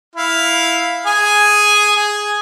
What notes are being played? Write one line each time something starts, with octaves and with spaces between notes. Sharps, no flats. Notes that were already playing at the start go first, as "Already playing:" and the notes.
E4 F5
G#4 G#5
G#4